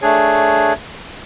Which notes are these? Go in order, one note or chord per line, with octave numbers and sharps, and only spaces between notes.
A3 D4 G#4 C#5